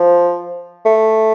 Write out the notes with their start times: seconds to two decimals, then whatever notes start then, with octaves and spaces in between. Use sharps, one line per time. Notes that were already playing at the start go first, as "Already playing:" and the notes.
Already playing: F3
0.86 A3